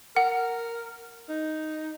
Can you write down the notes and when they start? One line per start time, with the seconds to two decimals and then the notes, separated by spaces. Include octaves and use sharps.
0.16 A#4 F#5
1.29 D#4